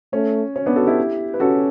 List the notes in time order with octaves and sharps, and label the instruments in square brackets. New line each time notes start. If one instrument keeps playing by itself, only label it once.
[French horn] A3 [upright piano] C#4
[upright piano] C#4
B3 D4
F#4 A4
E4 G4
B4
[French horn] C#4 [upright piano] F#4 A4